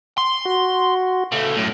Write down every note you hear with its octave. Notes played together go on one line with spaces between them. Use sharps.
C6
F#4
C#3 A3
F#2 A2